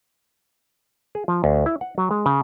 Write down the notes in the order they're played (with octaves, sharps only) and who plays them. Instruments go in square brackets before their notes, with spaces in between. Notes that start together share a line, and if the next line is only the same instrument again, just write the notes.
[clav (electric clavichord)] G#4
F3
D2
E4
F#5
F#3
G#3
C#3